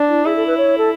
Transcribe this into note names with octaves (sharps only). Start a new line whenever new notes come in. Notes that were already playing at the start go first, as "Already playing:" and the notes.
Already playing: D4
E4
E4 G#4
A4
B4
C#5
A4